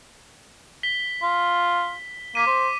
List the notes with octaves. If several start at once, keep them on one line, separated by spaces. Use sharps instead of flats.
B6 G7
F4
A#3 D6 B6 D#7
C5